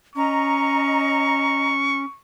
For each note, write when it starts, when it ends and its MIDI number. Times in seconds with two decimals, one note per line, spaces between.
0.16 2.05 61
0.16 1.71 75
0.16 1.71 82
0.16 2.20 85